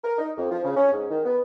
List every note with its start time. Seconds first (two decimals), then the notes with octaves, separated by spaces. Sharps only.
0.04 A#4
0.18 D#4
0.37 F2
0.51 F3
0.64 C#3
0.77 C#4
0.92 G#2
1.10 D#3
1.25 B3